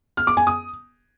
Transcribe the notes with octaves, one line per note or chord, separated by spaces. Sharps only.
F6
D6
G#5
D#6